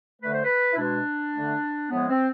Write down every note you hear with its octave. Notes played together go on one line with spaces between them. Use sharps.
D3 A3 B4
C5
B4
E4
B2 G#3 D4
D3 A3
A2 F3 G#3 B3
C4